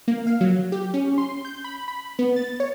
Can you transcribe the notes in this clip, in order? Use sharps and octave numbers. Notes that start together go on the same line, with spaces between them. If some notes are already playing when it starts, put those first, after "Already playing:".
A#3
F5
F#3
G4
C#4
C6
G6
B5
B5
B3
A6
C#5